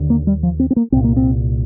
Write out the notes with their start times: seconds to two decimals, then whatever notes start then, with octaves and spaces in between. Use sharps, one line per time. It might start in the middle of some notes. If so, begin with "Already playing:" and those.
Already playing: D#2 D3
0.10 A#3
0.27 G3
0.43 F3
0.60 C4
0.71 C4
0.76 A#3
0.92 C2 A#2 C4
1.04 A#3
1.17 C4